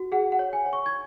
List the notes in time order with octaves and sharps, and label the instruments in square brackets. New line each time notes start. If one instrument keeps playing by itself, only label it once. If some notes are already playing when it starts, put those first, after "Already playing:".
Already playing: [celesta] F#4
G#4 F#5
F#5
C#5
G#5
C#5
C#6
G#6